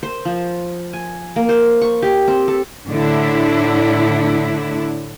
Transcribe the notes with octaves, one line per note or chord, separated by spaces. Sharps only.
C5
F3
G#5
A#3
C5
C#6
G4
C4
A4
A2 D3 D4 E4